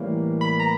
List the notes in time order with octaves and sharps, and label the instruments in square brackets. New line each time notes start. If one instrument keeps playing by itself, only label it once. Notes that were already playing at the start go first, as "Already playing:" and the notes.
Already playing: [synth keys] A2 E3 G3 A#3
B5
A#5